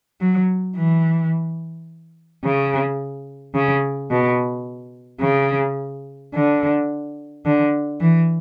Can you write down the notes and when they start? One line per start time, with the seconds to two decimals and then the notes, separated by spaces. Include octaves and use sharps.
0.20 F#3
0.76 E3
2.43 C#3
3.54 C#3
4.11 B2
5.21 C#3
6.33 D3
7.44 D3
8.00 E3